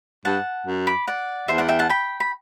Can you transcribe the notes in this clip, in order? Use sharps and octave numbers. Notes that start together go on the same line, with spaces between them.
G2 F#5 A5
F#2
B5 D6
D5 F#5
E2 C5 E5
D5 F#5
E5 G5
F#5 A5
G5 B5
B5